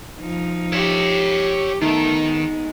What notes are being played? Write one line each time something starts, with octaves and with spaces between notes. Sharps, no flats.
F3 D#4
G4 C#5 E5
D#3 A3 B3 D#4
G#3